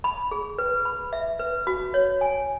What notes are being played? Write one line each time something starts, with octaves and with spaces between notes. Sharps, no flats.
B5
G#4
B4
B5
E5
B4
F#4
C#5
G#5